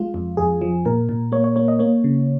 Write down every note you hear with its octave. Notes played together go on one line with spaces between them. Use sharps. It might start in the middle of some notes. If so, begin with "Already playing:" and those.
Already playing: G#3 F4
F2
F2 G#4
F3
A#2 A#4
A#2
A#3 C#5
C#5
A#3 C#5
D#5
A#3 C#5
C#3